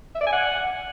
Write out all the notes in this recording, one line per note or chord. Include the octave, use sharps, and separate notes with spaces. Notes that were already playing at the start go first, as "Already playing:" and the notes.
E5
D5
G#5
F#5